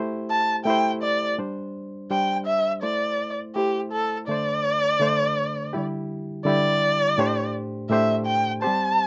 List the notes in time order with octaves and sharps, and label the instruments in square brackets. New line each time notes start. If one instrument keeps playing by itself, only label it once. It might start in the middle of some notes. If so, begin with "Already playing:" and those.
Already playing: [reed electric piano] A3 E4 G4 C5
[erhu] A5
[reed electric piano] A3 E4 G4 C5 [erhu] G5
[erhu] D5
[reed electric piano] G3 D4 C5
[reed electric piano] G3 D4 C5 [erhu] G5
[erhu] E5
[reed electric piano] A3 E4 C5 [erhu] D5
[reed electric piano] A3 E4 C5 [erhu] G4
[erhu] A4
[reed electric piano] D3 A3 D4 C5 [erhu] D5
[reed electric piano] D3 A3 D4 C5
D3 G3 E4 G4
[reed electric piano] D3 G3 E4 G4 [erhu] D5
[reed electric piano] A2 A3 D4 G4 C5
[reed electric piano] A2 A3 D4 G4 C5 [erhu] E5
[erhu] G5
[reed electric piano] G3 C4 G4 C5 [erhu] A5